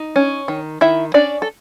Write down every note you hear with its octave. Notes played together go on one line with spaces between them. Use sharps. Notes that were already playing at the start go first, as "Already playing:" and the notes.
Already playing: D#4
C#4
D#3
D#3 E4 E5
C#4 D4 D5
A4